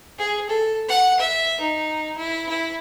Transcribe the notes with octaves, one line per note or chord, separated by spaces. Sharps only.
G#4
A4
F#5
E5
D#4
E4
E4